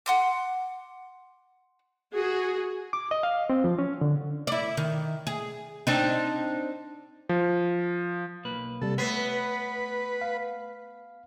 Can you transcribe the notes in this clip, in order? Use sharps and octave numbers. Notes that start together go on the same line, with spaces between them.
F#5 C6 D6
F#4 G#4
D6
D#5
F5
C4
F3
C#4
D3
E4 D5
D#3
G#4
C4 D4 D#4
F3
B1 A#3 B4
C3 G3 A4
A3 B3 B4 C#5 B6 C7
F5